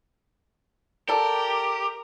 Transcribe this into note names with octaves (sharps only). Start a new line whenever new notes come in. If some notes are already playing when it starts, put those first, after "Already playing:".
G4 A4 A#4 D5